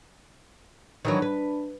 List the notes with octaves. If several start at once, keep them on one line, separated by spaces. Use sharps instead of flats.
D#3 E3 F#3 D4
B4